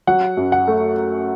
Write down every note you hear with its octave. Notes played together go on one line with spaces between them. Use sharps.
F#3 F#5
F#2
F#5
A3